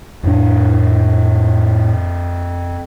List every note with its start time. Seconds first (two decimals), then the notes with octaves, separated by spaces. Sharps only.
0.23 F2 A2 D4